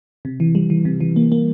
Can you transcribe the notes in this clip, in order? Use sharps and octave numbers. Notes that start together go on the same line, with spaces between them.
C3
E3
G3
E3
C3
E3
A#3
A#3